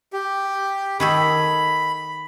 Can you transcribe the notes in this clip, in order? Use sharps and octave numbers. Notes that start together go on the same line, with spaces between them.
G4
D#3 G#4 A4 B5